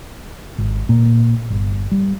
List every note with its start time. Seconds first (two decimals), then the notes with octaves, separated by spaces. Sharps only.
0.58 G#1
0.89 A#2
1.50 G1
1.92 G3